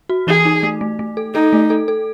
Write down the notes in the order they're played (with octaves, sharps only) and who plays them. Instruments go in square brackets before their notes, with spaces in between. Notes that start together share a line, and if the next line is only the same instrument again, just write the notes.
[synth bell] F#4
[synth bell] E3 [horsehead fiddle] G#4
[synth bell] D#4
A3
A3
A3
A4
[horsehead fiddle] D#4 [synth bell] A4
[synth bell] A3
A4
A4